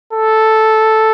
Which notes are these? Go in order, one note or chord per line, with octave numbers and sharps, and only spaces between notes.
A4